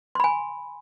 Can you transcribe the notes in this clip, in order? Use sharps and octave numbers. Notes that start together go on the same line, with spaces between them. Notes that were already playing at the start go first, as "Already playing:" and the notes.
G#5 B5 C6